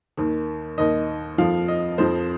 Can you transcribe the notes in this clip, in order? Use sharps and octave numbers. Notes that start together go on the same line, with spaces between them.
D#2 D#3
D#2 D#3 D#5
F2 F3 F5
D#5
F2 F3 C5